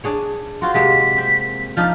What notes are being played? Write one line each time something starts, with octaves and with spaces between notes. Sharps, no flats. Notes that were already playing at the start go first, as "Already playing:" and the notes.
D4 G#4 C#5
C4 F4 F#4 C6
C3 G#3 A#3 B6
C4
F3 D4 D#4 F6